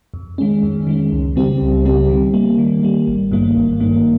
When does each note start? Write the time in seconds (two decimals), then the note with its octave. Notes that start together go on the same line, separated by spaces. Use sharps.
0.14 F2
0.38 D#3 G#3 C#4
0.63 F2
0.87 D#3 G#3 C#4
1.12 C#2
1.36 C#3 G3 C4 G4
1.61 C#2
1.85 C#3 G3 C4 G4
2.09 D#3
2.34 G3 A#3
2.58 D#3
2.83 G3 A#3
3.08 G#1
3.32 G2 D#3 A#3
3.56 G#1
3.80 G2 D#3 A#3